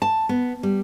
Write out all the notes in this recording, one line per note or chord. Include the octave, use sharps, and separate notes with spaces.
A5
B3
G3